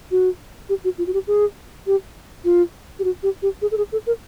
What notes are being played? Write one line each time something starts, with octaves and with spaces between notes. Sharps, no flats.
F#4
G4
F#4
F4
F#4
G4
G#4
G4
F4
G4
F#4
G4
G4
G#4
A4
G#4
A4
A#4